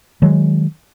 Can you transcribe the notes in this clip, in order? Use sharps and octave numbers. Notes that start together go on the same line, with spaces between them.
D#3 F#3 G#3